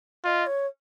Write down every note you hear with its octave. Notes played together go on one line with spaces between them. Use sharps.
F4 D#5
C#5